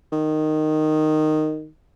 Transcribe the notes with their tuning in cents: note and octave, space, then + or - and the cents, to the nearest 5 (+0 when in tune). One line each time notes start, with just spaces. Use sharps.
D#3 -10